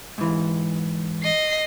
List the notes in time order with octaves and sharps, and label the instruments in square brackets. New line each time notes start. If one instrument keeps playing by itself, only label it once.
[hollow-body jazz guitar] G#2 E3
[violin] D#5 C7